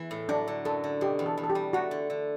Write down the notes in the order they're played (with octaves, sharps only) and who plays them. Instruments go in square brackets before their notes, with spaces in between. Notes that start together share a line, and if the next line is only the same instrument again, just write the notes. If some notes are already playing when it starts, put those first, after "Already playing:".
Already playing: [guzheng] E2 E3
A2
[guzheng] F#3 [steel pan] D4
[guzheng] D3
[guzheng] F#2 [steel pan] A4
[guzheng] D3
[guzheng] B2 [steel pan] G4
[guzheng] E2
[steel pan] A4
[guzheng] E2
[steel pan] A4
G4
[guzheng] G3
[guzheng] A3 [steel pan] F#4
[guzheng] D3
D3